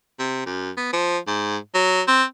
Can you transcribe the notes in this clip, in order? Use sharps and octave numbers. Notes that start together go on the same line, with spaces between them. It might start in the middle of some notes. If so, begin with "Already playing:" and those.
C3
F#2
B3
F3
G#2
F#3
C4